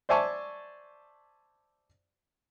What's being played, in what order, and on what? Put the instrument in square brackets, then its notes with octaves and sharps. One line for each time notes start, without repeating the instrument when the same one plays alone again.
[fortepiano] C5 D5 E5 G#5 A5 C#6